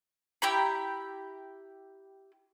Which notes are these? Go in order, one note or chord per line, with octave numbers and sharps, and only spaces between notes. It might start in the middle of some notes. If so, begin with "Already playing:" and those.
E4 G4 A#5 B5